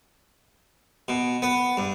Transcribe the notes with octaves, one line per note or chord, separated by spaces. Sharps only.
B2
B3
G2